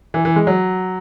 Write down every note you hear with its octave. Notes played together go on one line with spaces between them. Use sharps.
E3
E3
G#3
F#3